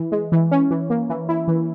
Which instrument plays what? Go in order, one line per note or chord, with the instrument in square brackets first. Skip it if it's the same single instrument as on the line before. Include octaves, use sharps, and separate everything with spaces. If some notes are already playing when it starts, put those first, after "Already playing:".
Already playing: [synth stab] E3
G#3
E3
C#4
E3
A#3
E3
E4
E3